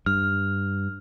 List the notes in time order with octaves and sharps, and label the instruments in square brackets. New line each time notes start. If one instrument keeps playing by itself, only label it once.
[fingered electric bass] G2 [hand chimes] F6